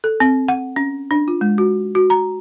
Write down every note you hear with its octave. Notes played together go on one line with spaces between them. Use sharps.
A4
C4
F#5
C#4
D4
F4
G#3
F#4
F#4
A#5